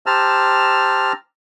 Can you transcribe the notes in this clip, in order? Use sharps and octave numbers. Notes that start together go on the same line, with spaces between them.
G4 C5 A5 A#5 E6 F6